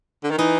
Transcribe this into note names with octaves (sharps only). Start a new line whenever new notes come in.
D3
D#3
E3 D#4